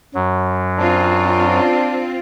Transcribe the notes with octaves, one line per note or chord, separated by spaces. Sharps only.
F#2 F#3
C4 D4 F4